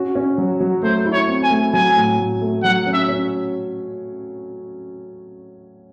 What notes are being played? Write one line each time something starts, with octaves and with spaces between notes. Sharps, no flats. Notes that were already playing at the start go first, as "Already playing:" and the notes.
Already playing: C#4 F#4
C#4
F#3
F#3
A3 C5
E4
C#5
C4
G#5
A3
F#3 G#5
A2
A2
A3
F#3 F#5
C#4
E5
C#4